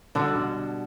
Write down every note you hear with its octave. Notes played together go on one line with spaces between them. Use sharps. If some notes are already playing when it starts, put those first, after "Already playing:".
B2 D3 G3 D4